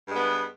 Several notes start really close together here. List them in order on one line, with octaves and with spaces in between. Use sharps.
G2 G#3 B3